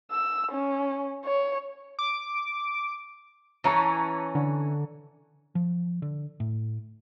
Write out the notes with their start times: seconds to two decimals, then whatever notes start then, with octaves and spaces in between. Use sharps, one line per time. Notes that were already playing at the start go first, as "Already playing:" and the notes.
0.11 E6
0.52 C#4
1.25 C#5
1.99 D6
3.64 E3 C#4 A5 A#5 C#6
4.35 D3
5.55 F3
6.02 D3
6.40 A2